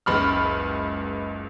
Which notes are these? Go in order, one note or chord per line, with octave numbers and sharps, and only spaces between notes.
F#1 C#2 B5 F6